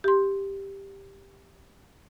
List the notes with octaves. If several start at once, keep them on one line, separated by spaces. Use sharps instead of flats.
G4 C6